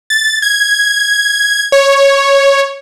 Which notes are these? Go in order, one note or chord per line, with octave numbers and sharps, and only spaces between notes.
A6
G#6
C#5